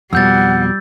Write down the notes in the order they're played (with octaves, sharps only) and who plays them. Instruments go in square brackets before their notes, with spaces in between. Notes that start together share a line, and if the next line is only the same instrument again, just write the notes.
[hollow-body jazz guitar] F2 B2 [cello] G3 [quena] F#5 [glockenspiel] E6 G6 A6